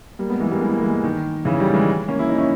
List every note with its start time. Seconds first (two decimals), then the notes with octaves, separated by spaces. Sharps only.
0.19 G3 A#3
0.29 G#3 B3
0.40 E3 G#3
0.51 G3 A#3
0.61 E3 G#3
0.74 A#3
0.82 E3 G#3
1.04 D#3
1.45 C#3 E3
1.60 D#3 G3
1.74 E3 G#3
2.08 A#3 C#4
2.19 E4
2.29 D#4
2.38 C#4 E4